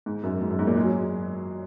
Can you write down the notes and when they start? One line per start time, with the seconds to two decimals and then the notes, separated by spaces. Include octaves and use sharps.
0.06 G#2
0.23 F#2
0.41 G#2
0.50 F#2
0.59 G#2
0.67 A#2
0.77 G#3
0.85 F#3